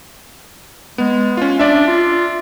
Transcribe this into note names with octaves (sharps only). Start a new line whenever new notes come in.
G#3 B3
C#4 F4
D4 D5 E5
F4